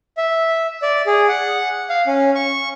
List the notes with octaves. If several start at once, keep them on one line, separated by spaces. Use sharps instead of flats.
E5
D5
G#4
F#5
F5
C#4
C#6